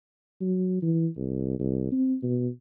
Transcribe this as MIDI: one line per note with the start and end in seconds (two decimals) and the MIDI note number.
0.41 0.78 54
0.83 1.07 52
1.17 1.57 36
1.59 1.88 36
1.92 2.16 60
2.23 2.48 47